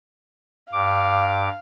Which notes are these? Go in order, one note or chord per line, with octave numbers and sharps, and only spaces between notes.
G2 F5 D6